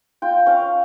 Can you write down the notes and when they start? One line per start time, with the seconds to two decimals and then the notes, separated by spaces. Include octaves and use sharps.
0.22 F4 G5
0.46 C#4 F5